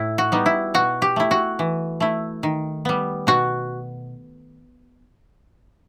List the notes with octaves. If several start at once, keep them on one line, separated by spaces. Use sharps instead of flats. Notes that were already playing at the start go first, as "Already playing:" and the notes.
Already playing: A2 E4
F#4
G3 B3 D#4
E4
B2 F#4
G4
A3 E4
F#4
E3
A3 E4
D#3
G3 B3
B2 F#4